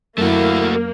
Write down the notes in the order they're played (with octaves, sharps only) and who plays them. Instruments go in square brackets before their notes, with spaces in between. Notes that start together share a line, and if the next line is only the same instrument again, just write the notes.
[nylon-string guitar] F#2 [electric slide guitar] A3 F#4 [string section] A#3 [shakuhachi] E4